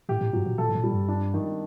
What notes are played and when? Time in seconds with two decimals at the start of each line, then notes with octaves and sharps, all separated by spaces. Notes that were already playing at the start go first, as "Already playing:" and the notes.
0.09 A2 G4
0.21 A2
0.33 G2 F#3
0.46 A#2
0.58 A#2 A4
0.69 A2
0.75 A#2
0.83 G3
0.92 G2
1.08 D4
1.34 D#3